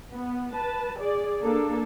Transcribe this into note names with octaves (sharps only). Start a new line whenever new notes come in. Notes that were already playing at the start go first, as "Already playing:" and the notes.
B3
B4 A5
G#4 D5
A#3 D4 A4